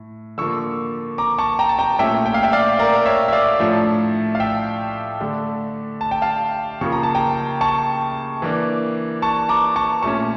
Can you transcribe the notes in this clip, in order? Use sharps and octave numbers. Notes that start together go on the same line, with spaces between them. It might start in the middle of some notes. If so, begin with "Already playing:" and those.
Already playing: A2
D3 F3 A#3 C#6 E6
A#5 D6
A5 C#6
G5 A#5
A5
G5 A#5
A#2 A3 C#4 E5 G5
G5
F5
E5 G5
D5 F5
A#4 D5
C#5 E5
E5
D5 F5
A2 F3 A3 D4
F5
E5 G5
D3 A3 D4
A5
G5
F5 A5
C#3 F3 A#3 C#6
A#5
A5
G5 A#5
A5 C#6
E3 A#3 D4
A5 C#6
A#5 D6
A5 C#6
A#2 A3 C#4 A5 C#6